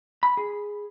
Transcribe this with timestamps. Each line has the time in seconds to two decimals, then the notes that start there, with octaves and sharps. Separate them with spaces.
0.23 B5
0.37 G#4